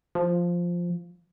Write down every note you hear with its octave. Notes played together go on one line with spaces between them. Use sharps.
F3